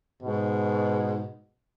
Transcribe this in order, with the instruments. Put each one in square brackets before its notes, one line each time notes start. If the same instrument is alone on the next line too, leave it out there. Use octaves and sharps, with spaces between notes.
[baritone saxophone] G#2 [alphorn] B2